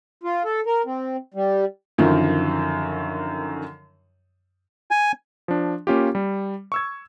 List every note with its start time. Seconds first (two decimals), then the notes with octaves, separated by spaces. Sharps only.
0.23 F4
0.45 A4
0.66 A#4
0.86 C4
1.34 G3
1.98 F#2 D3 D#3 F3
4.91 G#5
5.48 F3 D4
5.87 A#3 C#4 F4 G4
6.15 G3
6.72 C#6 E6 G#6